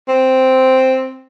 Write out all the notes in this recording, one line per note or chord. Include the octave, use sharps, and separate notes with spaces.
C4